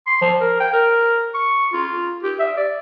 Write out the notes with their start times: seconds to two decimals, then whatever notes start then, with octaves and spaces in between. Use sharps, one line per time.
0.07 C6
0.21 F3
0.40 A#4
0.60 G5
0.73 A#4
1.34 C#6
1.73 F4
2.23 G4
2.39 E5
2.57 D5